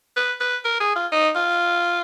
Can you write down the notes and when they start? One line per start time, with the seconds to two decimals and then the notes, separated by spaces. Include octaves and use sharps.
0.16 B4
0.40 B4
0.65 A#4
0.80 G#4
0.96 F4
1.12 D#4
1.35 F4